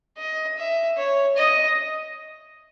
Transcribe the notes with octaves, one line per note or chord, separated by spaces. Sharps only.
D#5
E5
C#5
D#5